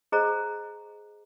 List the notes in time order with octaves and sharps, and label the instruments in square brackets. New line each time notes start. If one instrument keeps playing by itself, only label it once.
[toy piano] G#4 C5 D#5 A#5 C#6